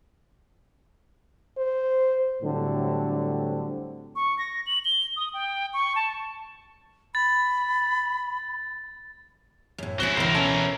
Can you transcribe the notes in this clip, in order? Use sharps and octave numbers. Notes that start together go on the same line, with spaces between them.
C5
A2 D3 F#3 G3 C4
C#6
A#6
F#7
G7
D#6
G5
C#6
A5
B5 A6
F#2 A2
C4 C#4 E4 F#4 G#4 G7
C#2 B2 E3 A#4 C5
C#4 A4